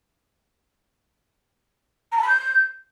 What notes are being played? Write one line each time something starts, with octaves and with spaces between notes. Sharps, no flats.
A#5
A5
B5
G6